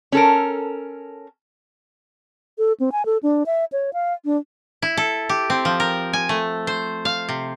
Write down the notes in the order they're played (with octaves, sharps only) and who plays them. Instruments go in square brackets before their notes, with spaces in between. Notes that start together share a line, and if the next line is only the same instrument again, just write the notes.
[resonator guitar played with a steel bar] C#4 A4 A#4
[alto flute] A4
C4
G#5
A4
D4
E5
C#5
F5
D4
[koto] E4
A4
G4
C4
F3
A#4
G#5
A3
C5
F5
C3